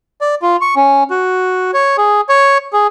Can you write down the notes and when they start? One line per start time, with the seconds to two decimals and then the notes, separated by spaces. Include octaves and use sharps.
0.21 D5
0.42 F4
0.61 C#6
0.76 C#4
1.10 F#4
1.74 C#5
1.98 G#4
2.29 C#5
2.73 G#4